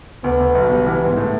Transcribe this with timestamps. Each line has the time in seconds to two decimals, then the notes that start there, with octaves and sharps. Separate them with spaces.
0.24 D2 B3
0.40 D2
0.55 B1
0.71 G3
0.86 E3 B3
1.01 G#2
1.17 A2